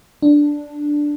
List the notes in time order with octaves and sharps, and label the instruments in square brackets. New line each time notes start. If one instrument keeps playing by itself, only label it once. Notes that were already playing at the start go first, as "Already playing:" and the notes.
[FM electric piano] D4